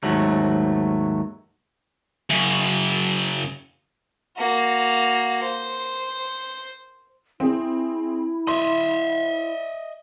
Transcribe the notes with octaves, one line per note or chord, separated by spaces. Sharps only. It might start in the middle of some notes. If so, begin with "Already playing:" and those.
D#2 G#2 F#3 A3
F#2 C#3
A#3 F#4
C5
C4 E4 G#4
D#5 E5 C6